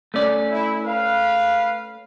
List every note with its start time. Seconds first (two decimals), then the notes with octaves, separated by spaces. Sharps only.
0.14 A3 C#4 D5
0.51 E4
0.85 B4 F5